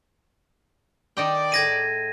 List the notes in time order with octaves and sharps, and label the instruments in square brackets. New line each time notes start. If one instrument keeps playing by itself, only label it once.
[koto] D#3 D#5 G5 [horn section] D5
[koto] A2 G#4 [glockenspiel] G#6 A#6 D#7